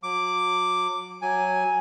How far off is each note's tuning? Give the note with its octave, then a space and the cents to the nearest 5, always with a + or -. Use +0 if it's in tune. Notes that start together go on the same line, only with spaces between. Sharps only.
F#3 -35 D6 +0
F#3 +0 G#5 +0